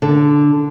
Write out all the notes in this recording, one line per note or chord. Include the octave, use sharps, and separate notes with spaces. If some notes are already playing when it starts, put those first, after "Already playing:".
D3